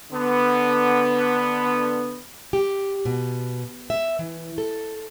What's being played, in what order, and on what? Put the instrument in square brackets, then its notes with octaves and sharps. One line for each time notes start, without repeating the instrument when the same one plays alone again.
[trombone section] D3 B3
[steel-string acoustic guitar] G4
B2
E5
E3
A4